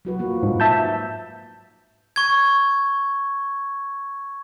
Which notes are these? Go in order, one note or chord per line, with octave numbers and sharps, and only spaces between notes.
F#3 F#4 B4
F3 A#3
G#2
E5 A5 G6
C#6 G#6